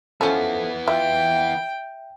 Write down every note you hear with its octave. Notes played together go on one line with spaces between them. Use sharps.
E3 F3 B3 C#4 A4
F4 E5 G5